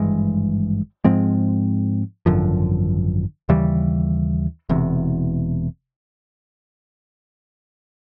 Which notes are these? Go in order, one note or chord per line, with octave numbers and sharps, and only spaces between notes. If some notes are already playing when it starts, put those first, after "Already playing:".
Already playing: G#1 G2 E3 G#3
G#2 F3 G#3 C4
G#1 F#2 D3 F3
D#2 C#3 E3 G3
E1 E2 C3